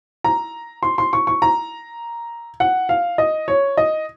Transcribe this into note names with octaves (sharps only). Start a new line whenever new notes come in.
A#5
C6
C6
C#6
C#6
A#5
F#5
F5
D#5
C#5
D#5